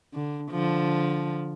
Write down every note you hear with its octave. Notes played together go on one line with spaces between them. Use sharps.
D3
D3 F3